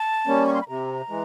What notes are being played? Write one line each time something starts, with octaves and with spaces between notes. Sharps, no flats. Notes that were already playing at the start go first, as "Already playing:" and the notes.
Already playing: A5
G3 A#3 C#4
C#6
C6
B5
C3 A#5
E3 G#3